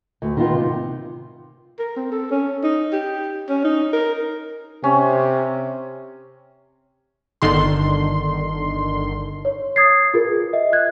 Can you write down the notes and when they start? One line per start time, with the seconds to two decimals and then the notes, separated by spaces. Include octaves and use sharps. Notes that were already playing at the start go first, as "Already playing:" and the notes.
0.22 D2
0.37 D#3 B3 F4
0.53 C3
1.79 A#4
1.96 C4
2.12 A4
2.31 C#4
2.63 D#4
2.93 G4
3.49 C#4
3.64 D#4
3.93 A#4
4.84 C3 C#4
7.42 G1 D3 D#3 C6
9.45 C#5
9.76 D#6 G#6 A6 C7
10.14 F4 G#4 A#4 B4
10.53 D#5 E5
10.73 F#6 G#6